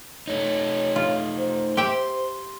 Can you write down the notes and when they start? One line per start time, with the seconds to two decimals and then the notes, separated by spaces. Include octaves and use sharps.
0.27 A3 D#4 C#5
0.96 F4
1.37 C5
1.77 G4 E5 G5 C6